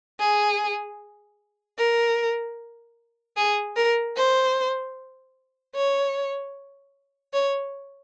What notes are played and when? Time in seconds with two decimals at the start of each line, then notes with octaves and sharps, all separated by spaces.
0.20 G#4
1.79 A#4
3.37 G#4
3.76 A#4
4.17 C5
5.75 C#5
7.33 C#5